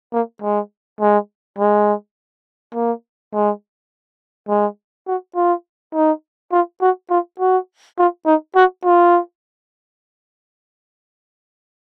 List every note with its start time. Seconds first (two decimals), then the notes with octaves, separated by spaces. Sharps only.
0.13 A#3
0.42 G#3
1.01 G#3
1.59 G#3
2.74 A#3
3.33 G#3
4.49 G#3
5.07 F#4
5.36 F4
5.94 D#4
6.52 F4
6.81 F#4
7.10 F4
7.40 F#4
7.98 F4
8.26 D#4
8.55 F#4
8.85 F4